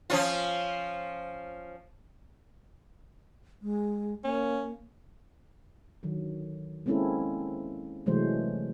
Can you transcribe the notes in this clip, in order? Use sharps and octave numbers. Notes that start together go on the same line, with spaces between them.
F3 C#4 F4
G#3
A#3 C#4
D3 D#3 F#3
G#3 A#3 C4 C#4 E4 A4
C3 E3 F#3 G#3 A3 C5